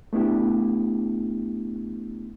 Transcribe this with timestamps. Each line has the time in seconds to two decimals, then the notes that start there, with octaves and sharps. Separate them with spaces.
0.13 A3 B3 D4 E4 G4